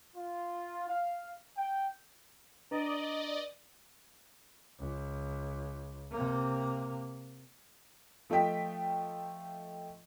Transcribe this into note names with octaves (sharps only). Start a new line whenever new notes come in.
F4
F5
G5
D4 B4 D5 D#5 A#5
C#2
C3 A#3
F3 A3 D#5 G5 B6